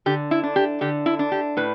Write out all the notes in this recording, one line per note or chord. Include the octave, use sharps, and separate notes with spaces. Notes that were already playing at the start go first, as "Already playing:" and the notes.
D3 G4
E4
D4
G4
D3 G4
E4
D4
G4
A2 B4